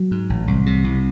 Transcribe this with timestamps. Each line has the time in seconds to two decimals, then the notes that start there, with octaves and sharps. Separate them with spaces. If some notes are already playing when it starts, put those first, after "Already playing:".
Already playing: F#3
0.11 G#2
0.30 A1
0.47 C2
0.66 C3
0.84 C2